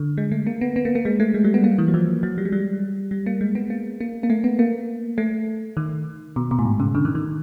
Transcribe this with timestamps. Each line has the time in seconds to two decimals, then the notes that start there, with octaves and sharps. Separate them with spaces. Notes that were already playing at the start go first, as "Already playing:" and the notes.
Already playing: D3
0.18 G#3
0.32 A3
0.47 A#3
0.61 B3
0.76 B3
0.85 A#3
0.95 A#3
1.05 G#3
1.20 A3
1.34 G#3
1.44 G3
1.54 B3
1.64 A#3
1.78 E3
1.88 F#3
1.94 F3
2.23 F#3
2.38 G3
2.45 G#3
2.52 G3
3.11 G3
3.26 A#3
3.41 G#3
3.55 B3
3.70 A#3
4.00 A#3
4.23 A#3
4.30 A3
4.44 B3
4.59 A#3
5.18 A3
5.77 D#3
6.36 B2
6.51 B2
6.59 A2
6.65 G#2
6.80 C#3
6.95 D3
7.05 D#3
7.15 D#3